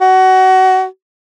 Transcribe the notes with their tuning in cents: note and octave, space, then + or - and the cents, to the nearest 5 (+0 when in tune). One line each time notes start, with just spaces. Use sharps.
F#4 +25